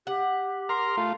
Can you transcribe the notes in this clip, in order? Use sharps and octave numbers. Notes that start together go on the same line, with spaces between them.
G4 F#5
A#4 A#5 C6 F6
A3 F4